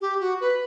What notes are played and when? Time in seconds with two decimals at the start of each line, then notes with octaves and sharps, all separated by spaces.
0.01 G4
0.20 F#4
0.41 B4